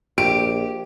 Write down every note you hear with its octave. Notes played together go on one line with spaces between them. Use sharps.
A#1 G4 D7